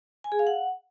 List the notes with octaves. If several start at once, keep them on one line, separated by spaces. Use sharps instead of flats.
G#5
G#4
F5
F#5